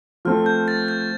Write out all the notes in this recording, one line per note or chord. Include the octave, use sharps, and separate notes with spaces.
F3 A3 C4 A4 F6
G6
A6
G6